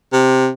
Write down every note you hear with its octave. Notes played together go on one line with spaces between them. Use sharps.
C3